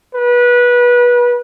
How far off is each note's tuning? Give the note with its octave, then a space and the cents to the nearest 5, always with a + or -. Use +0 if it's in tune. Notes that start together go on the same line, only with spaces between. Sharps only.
B4 -25